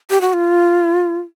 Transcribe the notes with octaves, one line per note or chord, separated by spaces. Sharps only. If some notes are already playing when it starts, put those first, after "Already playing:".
G4
F#4
F4